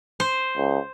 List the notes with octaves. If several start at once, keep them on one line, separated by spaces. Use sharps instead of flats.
C5
C#2